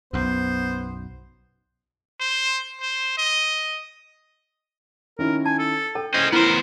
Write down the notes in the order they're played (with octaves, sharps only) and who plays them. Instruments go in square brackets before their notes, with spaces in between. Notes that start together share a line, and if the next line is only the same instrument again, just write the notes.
[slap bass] B1 F#2 [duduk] B3 [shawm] C5
[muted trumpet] C5
C5
D#5
[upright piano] D#3 C#4 E4 [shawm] A#4
[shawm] G#5 [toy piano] A5
[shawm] A4
[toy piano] A4 [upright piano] G5
[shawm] C#4 [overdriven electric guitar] C5 D#5
[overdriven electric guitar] B3 C5 [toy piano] E4 [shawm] A#4